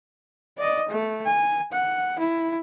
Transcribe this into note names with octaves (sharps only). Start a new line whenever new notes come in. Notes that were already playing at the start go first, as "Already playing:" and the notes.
D5 D#5
A3
G#5
F#5
E4